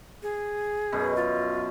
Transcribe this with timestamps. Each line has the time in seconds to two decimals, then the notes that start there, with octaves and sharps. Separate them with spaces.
0.23 G#4
0.92 F#2 B2
1.17 F4